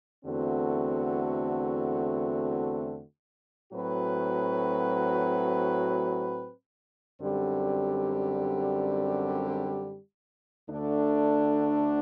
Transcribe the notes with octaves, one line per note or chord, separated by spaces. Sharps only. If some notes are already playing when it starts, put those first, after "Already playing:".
E2 D3 A3 C4 F#4
A2 F#3 C4 F#4 B4
F#2 D3 G3 C4 G4
D2 D3 A3 D4